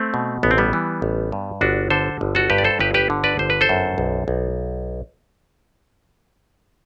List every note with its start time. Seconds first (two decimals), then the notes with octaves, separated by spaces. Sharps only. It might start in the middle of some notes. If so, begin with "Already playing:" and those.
Already playing: A3 C4
0.14 B2
0.43 A1 B3
0.51 C4
0.58 G3 B3
0.73 E3
1.02 A1
1.32 G2
1.61 G1 D4 F#4
1.90 D3 A4 C5
2.21 G1
2.35 F#4 A4
2.50 G2 G4 B4
2.58 D5
2.64 A4 C5
2.79 G1 G4 B4
2.94 G4 B4
3.10 D3
3.24 B4 D5
3.39 G1 C5
3.50 B4
3.61 A4 C5
3.69 F#2
3.98 B1
4.28 B1